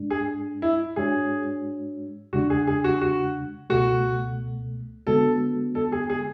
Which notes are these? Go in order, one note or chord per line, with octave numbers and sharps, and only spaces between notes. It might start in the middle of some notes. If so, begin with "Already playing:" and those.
Already playing: G#2 G#3 D4
G#4
E4
G#2 G#3 D4 F#4 G#4 C#5
E2 C#3 G#3 D4 F#4
G#4
G#4
F#4
F#4
C#2 B2 A3 F#4
D3 G#3 B3 F#4 A4
A4
G#4
G#4